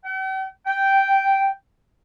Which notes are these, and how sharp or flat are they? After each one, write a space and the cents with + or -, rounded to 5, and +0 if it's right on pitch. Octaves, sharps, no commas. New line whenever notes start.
G5 -45
G5 -5